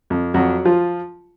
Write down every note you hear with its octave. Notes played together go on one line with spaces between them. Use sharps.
F2
F2 F#3 F#4
F3 F4